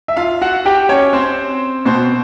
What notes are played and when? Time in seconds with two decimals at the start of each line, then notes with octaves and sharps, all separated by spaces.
0.08 E5
0.17 F4 F5
0.41 F#4 F#5
0.66 G4 G5
0.89 C#4 C#5
1.13 C4 C5
1.85 B2 C4 C5